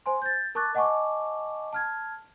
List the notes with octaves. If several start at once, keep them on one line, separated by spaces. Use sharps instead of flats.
C5 G#5 C6
G6 A6
A#4 A5 C#6 D6 F#6 A6
D#5 F#5 G#5 A5 C#6 D6
A5 F6 G#6